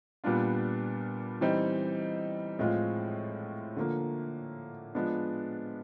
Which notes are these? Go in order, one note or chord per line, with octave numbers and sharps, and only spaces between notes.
A#2 G3 B3 D4 F4
E3 G3 C4 D#4
A2 F3 G#3 C4 F4
D3 F3 A#3
F3 G#3 B3 D4